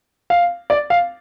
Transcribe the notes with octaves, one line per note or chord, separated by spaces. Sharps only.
F5
D5
F5